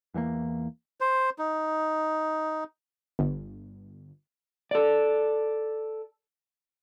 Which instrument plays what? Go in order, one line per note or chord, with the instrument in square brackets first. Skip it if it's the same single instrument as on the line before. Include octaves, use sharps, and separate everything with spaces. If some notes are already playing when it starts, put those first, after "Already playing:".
[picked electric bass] E2 E3 G3 A#3
[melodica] C5
D#4
[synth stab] G1
[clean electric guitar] A4 D5